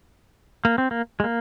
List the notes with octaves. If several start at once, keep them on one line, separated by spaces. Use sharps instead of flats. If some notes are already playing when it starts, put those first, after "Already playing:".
A#3
C4
A#3
G#3
A#3